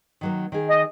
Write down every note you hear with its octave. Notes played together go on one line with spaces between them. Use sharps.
D#3 F#3 A#3
D#3 G#4
D#5